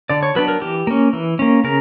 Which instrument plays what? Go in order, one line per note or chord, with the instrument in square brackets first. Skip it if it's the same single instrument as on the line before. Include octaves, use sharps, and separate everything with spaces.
[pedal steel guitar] D3 D5
C#5
F#3 B3 D4 B4
A#4
E3 G4
A#3 C#4
E3
A#3 C#4
C#3 A#4